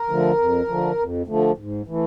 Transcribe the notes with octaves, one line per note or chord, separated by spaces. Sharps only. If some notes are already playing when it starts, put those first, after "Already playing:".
Already playing: A#4
D3 F3 A3
F2
D3 F3 A3
F2
D3 F3 A3
G#2
E3 A3